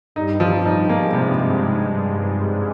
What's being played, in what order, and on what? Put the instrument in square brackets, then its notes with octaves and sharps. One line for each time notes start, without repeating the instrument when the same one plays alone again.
[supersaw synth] G2 G3 [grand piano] D#4
[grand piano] F3
D#4
[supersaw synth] G#2 G#3 [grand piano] A#3
[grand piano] C3